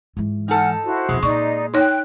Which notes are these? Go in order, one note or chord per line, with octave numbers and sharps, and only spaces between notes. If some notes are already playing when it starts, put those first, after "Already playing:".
G#2 E3
D#4 A4 F#5 G#5 F6
E4 F#4 C5
F2 B2 G#3
A#2 D#4 D5 C#6
D#4 C#5 G5 F#6